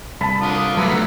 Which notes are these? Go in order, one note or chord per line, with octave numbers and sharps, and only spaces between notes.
C2 A5 B5
D3 F4 D#6
F#3 A3 B3 E5 A#5 D6